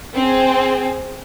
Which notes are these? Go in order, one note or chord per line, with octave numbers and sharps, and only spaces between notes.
C4 G#4